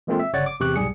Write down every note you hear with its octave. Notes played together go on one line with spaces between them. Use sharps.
E3 G#3 A#3 C4 F4 A4
E5
G1 C#3 C#5 D5 F#5 A6
D6
E2 C3 G4 C#6 D6 F#6
B1 G#2 G3 G#4 C#7